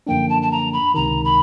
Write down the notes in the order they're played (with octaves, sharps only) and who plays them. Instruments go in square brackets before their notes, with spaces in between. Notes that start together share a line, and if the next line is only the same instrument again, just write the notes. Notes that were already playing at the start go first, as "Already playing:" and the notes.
[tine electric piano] F#2 D3 F3 A#3 D4 [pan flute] G5
[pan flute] A5
A5
A#5
B5
[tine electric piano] C#2 C3 D#3 [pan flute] A#5
[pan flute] B5